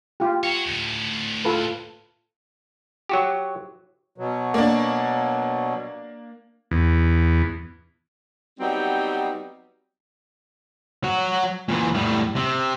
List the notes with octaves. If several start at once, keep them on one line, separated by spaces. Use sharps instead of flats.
F4 G4
F#4 C#5
D2 A2
F4 A4 B4
F#3 F#4 G4
B2 F#3
A#3 D4
E2
F#3 G3 B3 C4 D#4
F#3 F#4
A#2 E3
A2 G3
C3